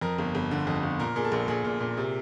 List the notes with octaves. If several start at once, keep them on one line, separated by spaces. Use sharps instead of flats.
F2 A#4
G1
G1
D3
F2
G1
A#2 A#4
A#2 G#4
A4
A#1
A#1 G#4
A#2
A#2
C3